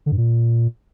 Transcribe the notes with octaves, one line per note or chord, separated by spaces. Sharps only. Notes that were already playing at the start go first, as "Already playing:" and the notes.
D3
G2
A#2